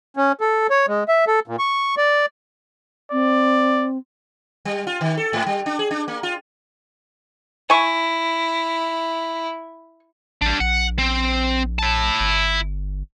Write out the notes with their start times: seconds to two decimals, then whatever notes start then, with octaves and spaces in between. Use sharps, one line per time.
0.17 C#4
0.41 A4
0.70 C#5
0.88 G#3
1.08 E5
1.27 A4
1.47 A#2
1.59 C#6
1.97 D5
3.12 C4 D5
4.65 G3
4.87 F4
5.01 D#3
5.17 A4
5.33 G#2
5.46 G3
5.66 D4
5.79 G#4
5.91 D4
6.08 A#3
6.23 F4
7.70 E4 G#5 C#6
10.42 A1 G3 D4
10.60 A#1 F#5
10.99 C4
11.79 E4 A5
12.20 G1